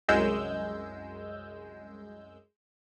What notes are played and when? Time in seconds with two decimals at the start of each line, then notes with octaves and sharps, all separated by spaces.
0.08 C2 F#2 G#3 E6 G6